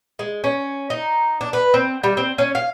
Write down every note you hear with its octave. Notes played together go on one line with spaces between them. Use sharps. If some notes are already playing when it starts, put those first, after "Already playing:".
G#3
C#4
D#4
D4
B4
C4
G3
C4
C#4
F5